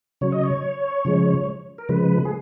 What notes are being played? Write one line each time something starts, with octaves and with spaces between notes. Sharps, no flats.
C#3 F#3 C#5
D#5
C#5
C#3 F3 G#3
A#4
C#3 F3 G#3 B4
G#4